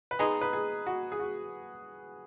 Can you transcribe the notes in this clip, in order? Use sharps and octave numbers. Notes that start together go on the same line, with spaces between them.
B4
G#3 B3 D#4 G#4
B4
G#4
F#4
G#4
F#4